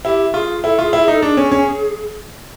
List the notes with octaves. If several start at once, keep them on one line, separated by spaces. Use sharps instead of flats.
E4 G4
F4 G#4
E4 A4
F4 G#4
E4
G#4
D#4 A4
D4 G#4
C#4
C#4